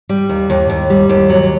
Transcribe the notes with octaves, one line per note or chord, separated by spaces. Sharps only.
G3
D#2
D#2
D#2
G3
D#2
F#3